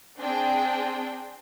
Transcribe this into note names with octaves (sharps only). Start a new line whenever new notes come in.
C4 D4 G#4 G5